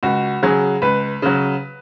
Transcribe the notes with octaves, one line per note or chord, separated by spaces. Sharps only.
C#2 F#4
C#3 F#3 G#4
C#2 B4
C#3 F#3